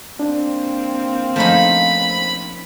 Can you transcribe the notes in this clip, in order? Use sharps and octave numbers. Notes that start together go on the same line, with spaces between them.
A#3 C4 D4
F3 A3 C#4 D#4 B5